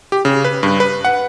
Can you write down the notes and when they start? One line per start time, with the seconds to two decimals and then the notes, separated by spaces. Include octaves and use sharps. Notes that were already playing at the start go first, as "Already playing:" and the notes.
0.12 G4
0.25 C#3
0.44 B4
0.63 G2
0.80 B4
1.05 F#5